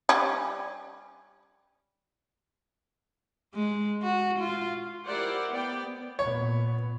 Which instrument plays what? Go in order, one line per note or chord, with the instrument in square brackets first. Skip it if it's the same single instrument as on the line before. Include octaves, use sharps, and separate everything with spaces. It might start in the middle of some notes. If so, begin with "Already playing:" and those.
[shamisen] G3 C#4
[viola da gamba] G#3
F#4
F4
[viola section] E4 G4 A#4 C5 D5 F#5
B3 D5 G5
[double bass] A#2 B3 [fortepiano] C#5